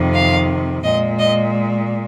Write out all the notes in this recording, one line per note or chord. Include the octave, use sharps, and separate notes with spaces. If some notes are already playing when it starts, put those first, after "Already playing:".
Already playing: F2 C3 D#3
F5
A#2 G#3 D#5
D#5